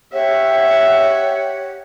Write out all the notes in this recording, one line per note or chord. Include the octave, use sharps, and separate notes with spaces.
G4 C#5 E5 F#5